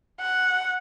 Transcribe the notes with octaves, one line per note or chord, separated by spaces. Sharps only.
F#5